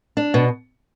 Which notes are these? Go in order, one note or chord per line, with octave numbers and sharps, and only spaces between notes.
D4
B2